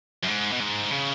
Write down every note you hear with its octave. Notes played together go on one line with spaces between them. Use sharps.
F#2
G#2
B2
G#2
C#3